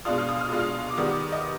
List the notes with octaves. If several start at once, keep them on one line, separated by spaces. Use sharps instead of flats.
B2 G#3 D4 F4 D#6
F6
D#6
F6
B2 G#3 D4 F4 D#6
F6
D6
D#3 G3 B3 D#6
D6
D#5